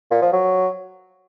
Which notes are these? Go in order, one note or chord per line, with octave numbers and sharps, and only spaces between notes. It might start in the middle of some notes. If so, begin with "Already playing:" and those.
A#2
F3
F#3